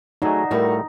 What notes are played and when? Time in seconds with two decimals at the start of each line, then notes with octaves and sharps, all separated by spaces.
0.22 F#3 A3 D#4 G#4 D5 F#5 A#5
0.51 A2 G3 A3 F#4 A4 A#4